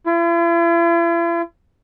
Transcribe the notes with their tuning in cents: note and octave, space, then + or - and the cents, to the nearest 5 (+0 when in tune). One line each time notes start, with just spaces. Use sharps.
E4 +45